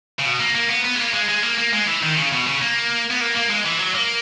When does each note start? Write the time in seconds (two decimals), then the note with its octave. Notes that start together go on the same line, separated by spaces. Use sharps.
0.19 C#3
0.25 B2
0.40 A#3
0.55 A#3
0.70 B3
0.85 B3
0.95 G#3
0.99 A#3
1.14 G#3
1.29 G#3
1.43 A#3
1.58 A#3
1.73 G#3
1.88 E3
2.03 D#3
2.18 C#3
2.32 B2
2.47 C#3
2.62 A#3
3.10 B3
3.21 A#3
3.35 A#3
3.50 G#3
3.65 E3
3.79 F#3
3.95 A#3